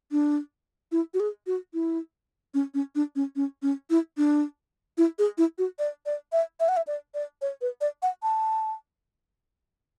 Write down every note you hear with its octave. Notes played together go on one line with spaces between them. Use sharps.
D4
E4
F#4
G#4
F#4
E4
C#4
C#4
D4
C#4
C#4
C#4
E4
D4
E4
G#4
E4
F#4
D5
D5
E5
E5
F#5
E5
D5
D5
C#5
B4
D5
F#5
A5